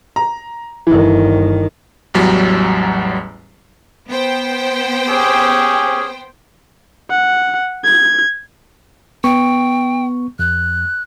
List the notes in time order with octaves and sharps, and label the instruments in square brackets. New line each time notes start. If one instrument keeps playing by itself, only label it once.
[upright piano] A#5
[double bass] G1 D#3 [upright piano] E3
[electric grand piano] A1 E2 F#3 G3
[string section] B3 C5 G5
[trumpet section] C#4 G4 G#4
[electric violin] F#5
G#6
[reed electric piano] B3 C#6 [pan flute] G5
[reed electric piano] F2 [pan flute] F#6